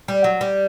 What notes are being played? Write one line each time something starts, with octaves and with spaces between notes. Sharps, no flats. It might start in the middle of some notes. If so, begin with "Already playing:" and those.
G3
F#3
G3